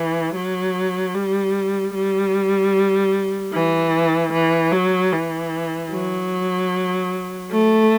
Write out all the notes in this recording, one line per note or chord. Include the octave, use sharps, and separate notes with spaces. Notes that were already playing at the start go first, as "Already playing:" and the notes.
Already playing: E3
F#3
G3
G3
E3
E3
F#3
E3
F#3
A3